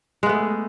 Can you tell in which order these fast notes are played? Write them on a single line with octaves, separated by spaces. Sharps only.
G#3 B3 A3